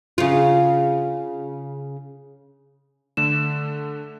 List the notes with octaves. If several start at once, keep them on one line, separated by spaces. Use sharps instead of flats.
C#3 F4
D3 A3 E7